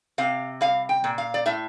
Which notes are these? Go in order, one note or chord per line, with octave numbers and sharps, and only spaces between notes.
C3 F5
G3 F5
G5
A#2
F5
D5
A2 E5